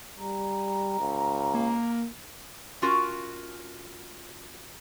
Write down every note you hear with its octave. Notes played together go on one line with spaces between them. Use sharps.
G3 A#5
C#2
A#3
C#4 F4 F#4 A#4